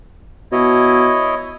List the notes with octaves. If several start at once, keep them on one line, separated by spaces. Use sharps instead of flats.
B2 E4 C#5 D#5